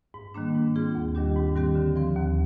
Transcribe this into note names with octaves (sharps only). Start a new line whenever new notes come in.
G#2
D#3 G3 A#3 D4
G#2
G3 C4 F4 G#4
D#2
D#3 G3 D4 G4
G#2
D#3 G3 C4 G4
D3
F3 C4
D#2